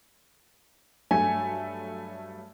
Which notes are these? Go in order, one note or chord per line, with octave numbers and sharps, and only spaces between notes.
G2 F#3 A3 G#5